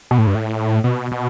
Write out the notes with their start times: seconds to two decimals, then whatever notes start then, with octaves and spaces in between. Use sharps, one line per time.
0.11 B2
0.18 A2
0.27 G2
0.35 A2
0.84 B2
1.12 B2